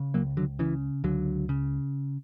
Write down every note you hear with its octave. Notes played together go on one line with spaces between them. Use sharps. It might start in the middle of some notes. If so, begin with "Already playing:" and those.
Already playing: C#3
C#2 F#3 A#3
D3 F#3
C#3 E3
C#2 D3 F#3
C#3